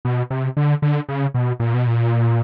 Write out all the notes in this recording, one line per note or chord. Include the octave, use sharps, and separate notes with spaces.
B2
C3
D3
D3
C#3
B2
A#2
B2
A#2